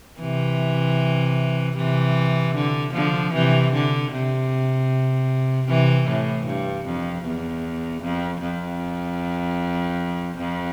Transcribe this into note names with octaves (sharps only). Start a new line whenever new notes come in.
C3 E3
C3 E3
D3
D3 F3
C3 E3
D3
C3
C3 E3
A2
G2
F2
E2
F2
F2
F2